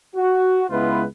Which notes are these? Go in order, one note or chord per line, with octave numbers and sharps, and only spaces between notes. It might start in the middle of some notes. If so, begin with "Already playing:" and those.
F#4
C#2 G#3 B3 E4 F4 B4